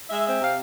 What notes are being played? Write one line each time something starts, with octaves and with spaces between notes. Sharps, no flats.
G#3 E5
C4 E5
C3 F5